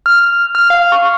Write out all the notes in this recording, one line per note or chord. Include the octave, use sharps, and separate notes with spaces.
F6
F6
F5
C#6